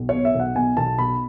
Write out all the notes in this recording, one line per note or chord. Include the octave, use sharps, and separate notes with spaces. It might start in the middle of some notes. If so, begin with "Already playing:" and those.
Already playing: B1
B2 C#5
E5
B1
F#5
B2 G#5
B1 A5
B2 B5